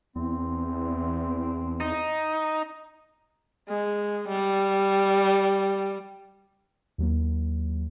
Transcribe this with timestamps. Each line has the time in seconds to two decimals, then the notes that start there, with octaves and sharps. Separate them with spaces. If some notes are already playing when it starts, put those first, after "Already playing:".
0.16 E2 C4
1.80 D#4
3.69 G#3
4.28 G3
6.98 D#2 F#3 A#3